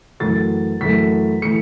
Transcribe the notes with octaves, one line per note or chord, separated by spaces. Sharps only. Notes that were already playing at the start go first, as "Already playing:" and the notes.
F#2 E3 A3 A6
F#2 E3 A3 B6
E3 A3 C#7